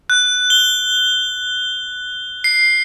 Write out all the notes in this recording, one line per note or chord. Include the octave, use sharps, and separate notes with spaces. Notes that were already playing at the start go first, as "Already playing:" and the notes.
F#6
G7
C7